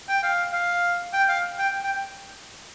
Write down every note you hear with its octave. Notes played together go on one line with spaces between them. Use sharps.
G5
F5
F5
G5
F5
G5
G5